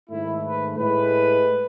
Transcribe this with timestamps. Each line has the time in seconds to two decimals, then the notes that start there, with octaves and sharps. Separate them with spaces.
0.10 G#2 D#3 A3 E4
0.43 B4
0.77 A2 G#3 B4